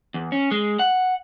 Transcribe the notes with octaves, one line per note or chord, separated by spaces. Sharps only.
E2
C#4
G#3
F#5